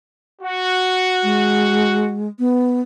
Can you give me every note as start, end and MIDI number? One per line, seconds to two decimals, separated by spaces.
0.41 2.16 66
1.23 2.28 56
2.39 2.81 59